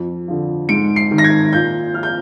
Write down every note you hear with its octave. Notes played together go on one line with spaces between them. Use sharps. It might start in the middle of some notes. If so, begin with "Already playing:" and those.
Already playing: F2
D3 F3
G#2 D7
C7
D#3
A#6
G#6
A#2 G6
F3 F6
G6